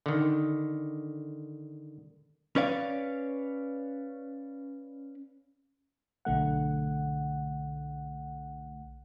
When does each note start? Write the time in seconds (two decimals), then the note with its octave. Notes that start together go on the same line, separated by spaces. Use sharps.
0.06 D3 D#3
2.56 C#4 B4 C#5 D5 F5
6.25 B1 D3 A3 F#5